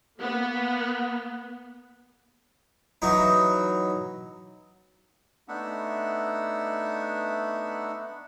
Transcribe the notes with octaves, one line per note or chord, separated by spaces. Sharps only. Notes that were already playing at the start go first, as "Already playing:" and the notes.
A#3 B3
E3 F#3 D#4
A3 B3 D4 D#4 E5 F#5